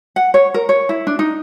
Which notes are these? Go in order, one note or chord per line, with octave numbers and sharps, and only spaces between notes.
F#5
C#5
A#4
C#5
E4
D4
D#4